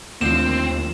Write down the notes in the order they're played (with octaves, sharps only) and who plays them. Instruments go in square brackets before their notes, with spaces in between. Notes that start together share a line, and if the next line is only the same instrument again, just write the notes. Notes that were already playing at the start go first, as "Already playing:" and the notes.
[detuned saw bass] D#2 [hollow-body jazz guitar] A2 D3 F3 [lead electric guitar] C4 [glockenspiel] E7